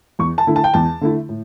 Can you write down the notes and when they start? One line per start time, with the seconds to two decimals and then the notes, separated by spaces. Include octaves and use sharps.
0.19 E2 C#6
0.38 A5
0.47 D3 A3 E4
0.56 A5
0.64 G5
0.74 E2 A5
1.01 D3 A3 E4
1.29 A2